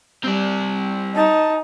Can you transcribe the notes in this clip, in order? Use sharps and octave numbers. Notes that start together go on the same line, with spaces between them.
G3 C4 D5
D#4 A5